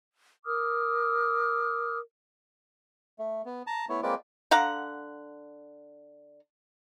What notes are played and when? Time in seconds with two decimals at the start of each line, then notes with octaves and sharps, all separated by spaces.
0.46 A#4 D6 D#6 F6
3.19 A3
3.46 B3
3.67 A5 A#5
3.89 A3 B3 E4 C#5
4.03 G#3 A#3 C4 F4 B4 D5
4.51 D3 F5 F#5 A#5